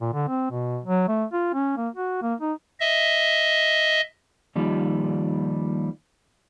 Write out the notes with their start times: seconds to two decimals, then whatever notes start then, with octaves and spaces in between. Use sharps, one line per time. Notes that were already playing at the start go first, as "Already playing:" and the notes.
0.01 A#2
0.13 D3
0.28 C4
0.51 B2
0.84 F#3
1.08 A3
1.32 F4
1.54 C#4
1.77 A#3
1.95 F#4
2.22 A#3
2.41 D#4
2.80 D#5 E5
4.56 D#2 D#3 F3 G3